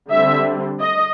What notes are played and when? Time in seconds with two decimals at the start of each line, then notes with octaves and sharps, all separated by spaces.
0.10 D3 G3 C4 E5
0.80 D#5